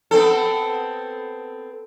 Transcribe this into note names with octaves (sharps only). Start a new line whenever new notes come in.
B3 C4 A4